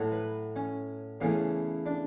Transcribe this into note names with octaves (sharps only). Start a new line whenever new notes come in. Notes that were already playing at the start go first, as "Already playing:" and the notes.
Already playing: A2 F#3 A3
B4
C#4
E2 C#3 E3 A3
D4